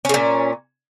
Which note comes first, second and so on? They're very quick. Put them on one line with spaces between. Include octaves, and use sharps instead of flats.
C#4 C#3 A#2